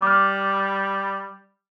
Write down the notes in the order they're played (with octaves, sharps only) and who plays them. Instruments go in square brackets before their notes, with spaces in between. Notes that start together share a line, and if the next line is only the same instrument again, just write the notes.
[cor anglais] G3 [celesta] D6 F6